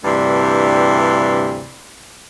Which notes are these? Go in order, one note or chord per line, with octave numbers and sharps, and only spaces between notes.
D2 G2 C3 E3 D4